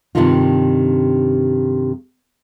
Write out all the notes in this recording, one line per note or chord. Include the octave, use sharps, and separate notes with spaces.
G2 C3 D#3 D4 D#4 F4